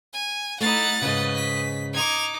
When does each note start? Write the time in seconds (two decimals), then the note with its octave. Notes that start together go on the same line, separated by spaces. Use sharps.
0.14 G#5
0.61 A3 D#4 E4 F#5 A6
1.02 G#2 C#3 B4 D#5
1.35 B6
1.93 D#4 D6 G#6 F7